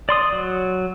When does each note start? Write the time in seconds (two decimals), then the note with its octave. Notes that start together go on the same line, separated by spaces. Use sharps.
0.09 D5 C6 D#6
0.32 F#3